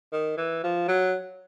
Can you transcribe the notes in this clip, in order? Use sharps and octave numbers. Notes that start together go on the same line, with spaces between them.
D#3
E3
F3
F#3